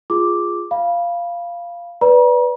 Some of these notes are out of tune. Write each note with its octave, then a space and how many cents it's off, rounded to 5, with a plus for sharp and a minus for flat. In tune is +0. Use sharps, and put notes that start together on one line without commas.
F4 +0 G#4 +0 D6 +0
F5 -10 B5 -20
B4 +0 D5 -20 A#5 +45